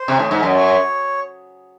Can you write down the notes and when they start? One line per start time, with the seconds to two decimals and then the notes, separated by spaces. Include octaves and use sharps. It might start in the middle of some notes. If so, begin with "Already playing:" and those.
Already playing: C5
0.08 C3
0.19 A2
0.29 G#2 E5
0.41 F#2 D#5
0.55 C#5